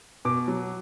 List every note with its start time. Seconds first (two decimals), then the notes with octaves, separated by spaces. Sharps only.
0.25 B2 D6
0.48 F#3